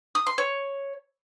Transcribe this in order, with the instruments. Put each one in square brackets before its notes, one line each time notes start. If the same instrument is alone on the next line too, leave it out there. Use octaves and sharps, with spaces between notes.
[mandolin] D#6
C6
C#5